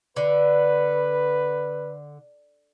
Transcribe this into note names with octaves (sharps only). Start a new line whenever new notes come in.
D3 B4